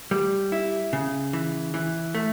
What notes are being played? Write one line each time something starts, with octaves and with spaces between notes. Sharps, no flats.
G3
E4
C#3
E3
E3
A3